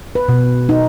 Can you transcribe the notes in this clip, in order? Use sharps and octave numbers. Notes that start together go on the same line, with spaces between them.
B4
B2
D#4